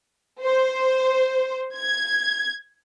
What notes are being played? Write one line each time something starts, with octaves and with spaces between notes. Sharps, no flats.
C5
G#6